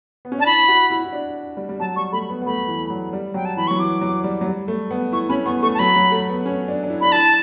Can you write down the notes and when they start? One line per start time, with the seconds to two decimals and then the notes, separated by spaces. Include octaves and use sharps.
0.25 B3
0.32 C#4
0.39 D4 A5
0.46 E4 B5
0.68 F#4
0.90 E4
1.04 E4
1.13 D4
1.57 G3
1.69 G3
1.80 F#3 A5
1.96 G3 C#6
2.13 A3 B5
2.30 B3
2.42 B3
2.46 A3 B5
2.68 E3
2.90 F#3
3.13 G3
3.34 F#3 G5
3.45 A5
3.57 E3 B5
3.68 F#3 C#6
3.79 E3 D6
4.01 F#3
4.24 G3
4.41 F#3
4.46 G3
4.68 A3
4.91 B3
5.12 E4 C#6
5.29 C#4 B5
5.46 B3 C#6
5.63 A3 C#6
5.74 A5
5.79 F#3 B5
5.96 F#3
6.12 A3
6.29 B3
6.46 C#4
6.68 D4
6.83 D4
6.90 E4
7.01 D4 B5
7.12 E4 A5